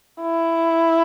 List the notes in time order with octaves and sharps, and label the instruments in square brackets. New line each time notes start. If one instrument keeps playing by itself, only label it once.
[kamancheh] E4